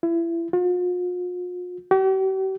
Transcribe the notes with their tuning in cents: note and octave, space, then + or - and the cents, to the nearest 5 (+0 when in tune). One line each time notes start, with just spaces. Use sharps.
E4 +30
F4 +45
G4 -45